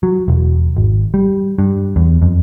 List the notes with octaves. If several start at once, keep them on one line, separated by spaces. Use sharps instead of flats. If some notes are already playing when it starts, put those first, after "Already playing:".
F#3
E1
G#1
G3
G2
E2
F2